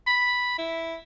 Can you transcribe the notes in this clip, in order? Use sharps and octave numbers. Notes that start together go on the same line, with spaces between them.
B5
E4